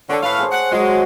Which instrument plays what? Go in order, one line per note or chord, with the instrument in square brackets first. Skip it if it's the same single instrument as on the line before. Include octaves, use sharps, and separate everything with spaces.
[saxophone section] D3 [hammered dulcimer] C#5 A5
[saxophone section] A2 B4 F5 [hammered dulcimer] C#6
[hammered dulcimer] G#4 C5
[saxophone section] F#5
[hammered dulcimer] F#3 F#4 [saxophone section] G#3